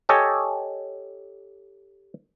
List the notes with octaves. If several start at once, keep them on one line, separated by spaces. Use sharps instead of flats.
G4 A4 C#5 D#5 G#5